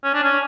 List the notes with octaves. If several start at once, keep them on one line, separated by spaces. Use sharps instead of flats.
C#4
D4
C#4